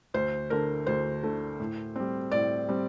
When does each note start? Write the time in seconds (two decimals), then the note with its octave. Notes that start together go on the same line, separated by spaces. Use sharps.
0.14 D2 C5
0.50 D3 A3 A#4
0.87 D2 C5
1.23 D3 A3
1.60 A2
1.96 G3 C4
2.31 A2 D5
2.69 G3 C4